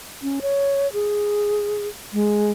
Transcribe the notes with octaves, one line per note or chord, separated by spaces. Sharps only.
C#4
C#5
G#4
G#3